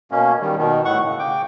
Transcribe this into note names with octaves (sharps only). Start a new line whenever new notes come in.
B2 A#3 C#4
D#3 G3
B2 D#3
A2 F#5 C#6
C#3
C#3 G5 D6